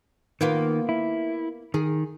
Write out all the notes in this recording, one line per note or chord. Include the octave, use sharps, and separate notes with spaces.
D#3 A#3 B3 F4
E4
D#3 G#4